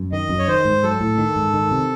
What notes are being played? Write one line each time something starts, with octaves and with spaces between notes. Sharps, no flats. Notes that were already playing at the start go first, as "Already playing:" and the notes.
Already playing: F#2
D#3 D#5
F#2
C#5
D#3 C5
G#2
F#3 A4
A2
D#3
G#2
D#3
C3